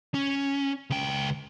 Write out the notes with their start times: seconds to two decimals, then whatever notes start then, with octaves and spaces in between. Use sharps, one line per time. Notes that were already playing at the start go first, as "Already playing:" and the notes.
0.14 C#4
0.90 C#2 G5